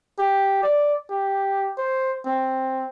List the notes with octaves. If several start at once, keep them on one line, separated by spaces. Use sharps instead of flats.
G4
D5
G4
C5
C4